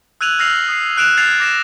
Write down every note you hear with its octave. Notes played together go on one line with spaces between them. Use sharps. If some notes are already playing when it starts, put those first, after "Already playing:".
E6 F#6 G#6 D#7 F7 F#7
E6 F6 A#6 C7 F7 F#7
D#6 C7
F#6 D7 E7 F7
F#6 G#6 A6 C7 F7
D6 A#6 E7